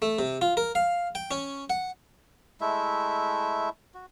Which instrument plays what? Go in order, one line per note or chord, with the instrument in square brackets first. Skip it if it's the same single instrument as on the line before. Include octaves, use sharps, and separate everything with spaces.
[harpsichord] A3
C3
F4
A#4
F5
G5
C#4
F#5
[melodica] G#3 A3 E4 E5
F#4